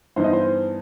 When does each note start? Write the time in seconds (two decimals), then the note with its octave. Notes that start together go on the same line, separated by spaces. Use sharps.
0.16 G2 E3 B3 D#4 C5
0.24 D#5
0.33 C5